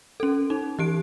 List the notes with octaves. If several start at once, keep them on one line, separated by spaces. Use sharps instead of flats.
C#4 A4
D#4
E3 G4 D7